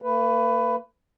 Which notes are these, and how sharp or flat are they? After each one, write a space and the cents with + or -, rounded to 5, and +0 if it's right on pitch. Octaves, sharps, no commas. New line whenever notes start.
A#3 -40 B4 +15